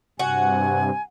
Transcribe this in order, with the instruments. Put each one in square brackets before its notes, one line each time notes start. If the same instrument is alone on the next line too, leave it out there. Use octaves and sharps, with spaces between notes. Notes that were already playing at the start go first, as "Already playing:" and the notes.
[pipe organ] G2 C3 [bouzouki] F#4 [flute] G#5